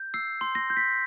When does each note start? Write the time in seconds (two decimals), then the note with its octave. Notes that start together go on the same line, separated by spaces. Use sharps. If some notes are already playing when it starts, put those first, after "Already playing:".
Already playing: G6
0.14 E6 C7
0.41 C6
0.55 A#6
0.70 G6
0.77 B6